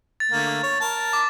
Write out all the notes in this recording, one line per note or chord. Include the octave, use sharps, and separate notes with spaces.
A6
D3 A3 A#3
C#5
A#4 A5
D6